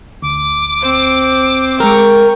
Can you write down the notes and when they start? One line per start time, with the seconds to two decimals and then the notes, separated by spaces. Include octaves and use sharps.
0.22 D2 D6
0.81 C4 C5
1.80 G#3 A#4 G5 C#6 F6